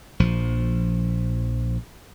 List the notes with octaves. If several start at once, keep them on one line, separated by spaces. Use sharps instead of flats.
A#1 F3